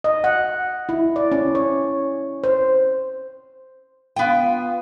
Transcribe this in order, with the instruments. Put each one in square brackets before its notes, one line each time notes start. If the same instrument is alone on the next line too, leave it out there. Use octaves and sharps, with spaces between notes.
[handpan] D#5
F#5
E4
D5
C#4
C#5
C5
[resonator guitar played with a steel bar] B3 G5 [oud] F4